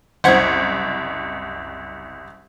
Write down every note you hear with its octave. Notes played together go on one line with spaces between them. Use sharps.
F#1 C2 C5 F#5 G#6